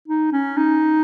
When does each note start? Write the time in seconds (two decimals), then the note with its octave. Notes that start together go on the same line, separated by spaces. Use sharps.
0.08 D#4
0.32 C#4
0.57 D#4